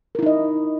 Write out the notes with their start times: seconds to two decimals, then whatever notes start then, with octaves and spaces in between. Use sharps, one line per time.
0.15 A#4
0.19 E4
0.23 D#4
0.26 D#5